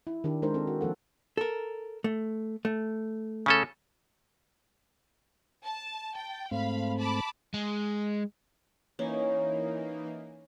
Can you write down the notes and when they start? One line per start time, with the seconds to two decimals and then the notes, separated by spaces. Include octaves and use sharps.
0.07 E4
0.24 D#3 D4 G4
0.42 G#3 D4 D#4 A#4 C5
0.54 C4 A4
0.67 F#4
0.81 F3 A#3 A4 F#5
1.37 A4 A#4
2.04 A3
2.65 A3
3.46 C#3 C#4 A4
5.63 A5
6.15 G5 A5
6.51 G#2 A3 C4 F5 B5
6.97 A5 B5 D6
7.54 G#3
8.99 E3 A#3 C#4 D#4